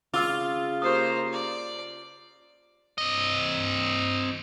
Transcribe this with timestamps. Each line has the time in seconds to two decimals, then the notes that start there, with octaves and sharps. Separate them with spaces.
0.14 C#3 F4 D6 E6
0.82 A#3 G4 C5 D#6
1.33 D5
2.98 C4 D#5